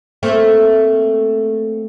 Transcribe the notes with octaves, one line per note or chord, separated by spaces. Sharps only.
A3 A#3 C4